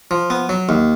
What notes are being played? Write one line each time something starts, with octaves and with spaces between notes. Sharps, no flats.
F3
B3
F#3
D#2